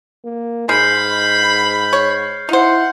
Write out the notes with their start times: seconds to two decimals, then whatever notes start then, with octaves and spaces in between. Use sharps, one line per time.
0.25 A#3
0.69 G#2 G#3 B5 F6 G6 C7
1.93 C#5
2.49 D#4 E4 C5 F#5